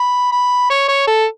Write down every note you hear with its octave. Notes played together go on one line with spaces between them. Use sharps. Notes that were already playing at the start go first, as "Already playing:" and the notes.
Already playing: B5
B5
C#5
C#5
A4